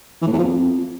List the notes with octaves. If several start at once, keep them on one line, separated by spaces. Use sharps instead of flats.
E3
A2
E2
F3
F2